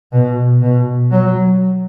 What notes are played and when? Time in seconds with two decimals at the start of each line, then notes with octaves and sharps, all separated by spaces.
0.13 B2
0.62 B2
1.11 F#3